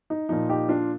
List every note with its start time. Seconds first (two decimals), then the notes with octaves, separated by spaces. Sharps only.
0.10 D#4
0.29 A#2 F3 D#4
0.49 D#4 G4
0.69 D4 F4